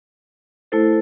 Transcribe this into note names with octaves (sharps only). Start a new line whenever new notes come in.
A3 E4 A4 C5